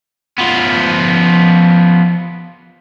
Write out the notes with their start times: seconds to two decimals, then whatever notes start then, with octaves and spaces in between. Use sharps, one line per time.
0.38 F3 B3